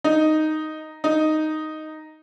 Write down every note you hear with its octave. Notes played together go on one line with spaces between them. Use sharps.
D#4
D#4